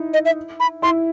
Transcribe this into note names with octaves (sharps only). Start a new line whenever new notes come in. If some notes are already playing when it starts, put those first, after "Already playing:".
Already playing: D#4 E4
D#5
E5
B5
E4 C6